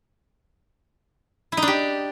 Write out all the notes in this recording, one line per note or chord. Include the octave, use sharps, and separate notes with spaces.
E4
D#4
D4
G4